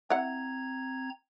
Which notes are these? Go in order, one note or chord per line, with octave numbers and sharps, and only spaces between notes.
C4 E4 F#5 A#5 G#6